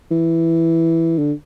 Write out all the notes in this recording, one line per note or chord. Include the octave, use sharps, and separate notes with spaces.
E3
D3